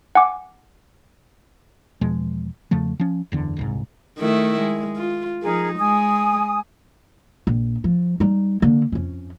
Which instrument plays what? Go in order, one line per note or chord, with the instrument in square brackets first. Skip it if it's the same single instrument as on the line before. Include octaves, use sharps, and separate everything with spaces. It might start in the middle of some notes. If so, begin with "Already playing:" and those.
[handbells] F#5 G#5 D6
[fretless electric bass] E2 B2 F3 G#3
E2 C#3 F3 A3
F3 C#4
F#1 E2 D3
D#1 C2 G#2
[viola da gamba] D#3 A3 E4
G#3
F4
[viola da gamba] F3 D#4 [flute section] G#4 A#4
[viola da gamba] G#3 [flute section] G#5 D#6
[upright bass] A#1
F3
G3 D#4
D3 A#3
F2 C#4